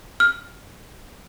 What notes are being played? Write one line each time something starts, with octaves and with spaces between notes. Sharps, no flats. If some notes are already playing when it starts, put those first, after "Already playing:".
F6